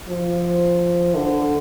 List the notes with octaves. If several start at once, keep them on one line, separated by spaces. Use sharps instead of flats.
F3
D3